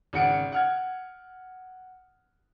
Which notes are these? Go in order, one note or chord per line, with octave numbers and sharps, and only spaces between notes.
G#1 C#3 F#5 C#7 D7
F#5 F6 G#6